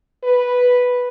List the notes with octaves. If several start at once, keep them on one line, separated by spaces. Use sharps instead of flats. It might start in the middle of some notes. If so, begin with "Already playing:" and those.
B4